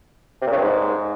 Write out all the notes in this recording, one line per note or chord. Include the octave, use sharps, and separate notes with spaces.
C3
A#2
C#3
G2
G#2